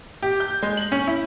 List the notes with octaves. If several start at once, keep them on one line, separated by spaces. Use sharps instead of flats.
G4
G6
G#3
F#7
C#4
E4